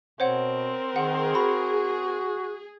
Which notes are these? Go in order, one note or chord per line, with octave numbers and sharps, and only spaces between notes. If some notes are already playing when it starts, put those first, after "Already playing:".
B2 C4 A#4 C5 C#5 F#5
D#3 G#4 F#5
F#4 B5